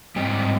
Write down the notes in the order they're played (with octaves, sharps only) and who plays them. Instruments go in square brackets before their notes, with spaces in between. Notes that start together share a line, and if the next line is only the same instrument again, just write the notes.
[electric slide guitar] G#2 G3 C4 D#5 G5